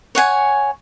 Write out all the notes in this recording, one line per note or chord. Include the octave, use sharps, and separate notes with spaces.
C#5 F#5 G#5